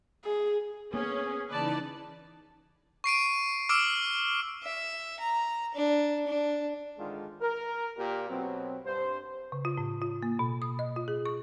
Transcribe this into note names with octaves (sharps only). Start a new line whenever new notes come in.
G#4
A#3 B3 C#4 G#4
C#3 E3 D#4 B4 D5 A5
C#6 C7 D7 D#7
D6 E6 F6 D7
E5
A#5
D4
D4
G#2 D3 D#3 G#3 D4 F4
A#4
A#2 G4 A#4
B2 F#3 C4
G2 C5
C#3
F4
A2
F4
A#3
B2
D#6
D#5
F4
G#4
C#6